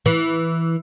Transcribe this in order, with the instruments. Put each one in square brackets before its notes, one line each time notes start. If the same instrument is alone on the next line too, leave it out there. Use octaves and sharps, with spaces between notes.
[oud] E3